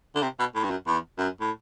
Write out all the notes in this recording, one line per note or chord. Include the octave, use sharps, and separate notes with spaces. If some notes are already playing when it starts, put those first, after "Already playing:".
D3
C3
B2
A2
G2
F#2
E2
F#2
A2